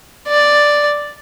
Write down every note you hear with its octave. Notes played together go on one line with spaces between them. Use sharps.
D5